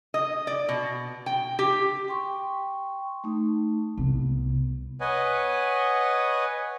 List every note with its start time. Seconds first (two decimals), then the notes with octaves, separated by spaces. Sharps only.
0.14 D#5
0.47 D5
0.69 B2
1.26 G5
1.59 G4
2.08 G5 C6 C#6
3.24 A3 D#4
3.98 C2 B3
5.01 B4 C#5 D#5 F#5 G#5